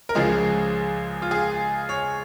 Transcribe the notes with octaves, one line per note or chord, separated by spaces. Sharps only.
A#4
C#2 C#3 F3 G#3 G#4
F4
G#4
C#5